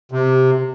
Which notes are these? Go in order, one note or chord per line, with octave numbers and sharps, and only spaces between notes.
C3